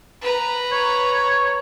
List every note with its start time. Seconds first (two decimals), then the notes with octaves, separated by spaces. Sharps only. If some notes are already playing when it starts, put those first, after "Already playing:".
0.21 B4 A#5
0.72 C#5